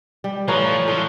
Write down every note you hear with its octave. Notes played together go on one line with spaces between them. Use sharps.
G3
A2 E3 F3 E4 B4 C#5 A#5
A2 F3 F#3